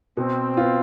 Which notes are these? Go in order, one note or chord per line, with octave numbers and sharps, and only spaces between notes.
B2 C4
B3 F4